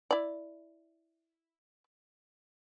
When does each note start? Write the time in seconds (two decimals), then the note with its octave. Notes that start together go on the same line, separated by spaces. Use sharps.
0.11 E4 D5